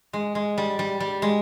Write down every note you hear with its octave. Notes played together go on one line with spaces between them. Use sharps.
G#3
G#3
G3
G3
G3
G#3